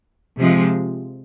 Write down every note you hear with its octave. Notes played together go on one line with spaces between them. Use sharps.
C3 F3 G#3